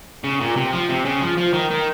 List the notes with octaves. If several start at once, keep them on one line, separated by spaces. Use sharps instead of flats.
C#3
A#2
C3
F3
C3
C#3
F3
F3
D#3
D#3